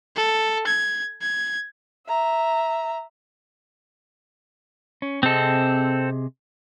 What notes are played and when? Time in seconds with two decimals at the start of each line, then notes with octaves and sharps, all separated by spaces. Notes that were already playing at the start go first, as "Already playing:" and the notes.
0.16 A4
0.67 G#6
1.22 G#6
2.07 E5 A#5
5.02 C#4
5.23 C3 C4 G#4 A4 D#5